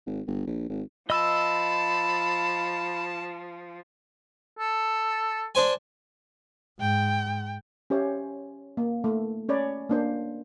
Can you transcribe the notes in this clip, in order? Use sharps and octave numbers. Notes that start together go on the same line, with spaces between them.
G#1
G1
A#1
G#1
F3 D#5 A5 B5 E6
A4
D4 C5 G#5
G#2 G5
C#4 G4 C5 C#5 E5
A#3
A3
C#4 C#5 D5 B5
A#3 D4 C5